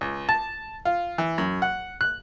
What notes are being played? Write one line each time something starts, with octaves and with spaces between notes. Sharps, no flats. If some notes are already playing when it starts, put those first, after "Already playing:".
C#2
A5
F4
E3
F#2
F#5
F#6